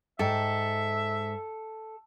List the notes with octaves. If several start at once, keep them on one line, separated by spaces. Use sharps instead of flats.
G#2 A4 E5 G5